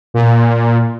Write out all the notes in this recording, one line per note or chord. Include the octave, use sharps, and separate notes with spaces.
A#2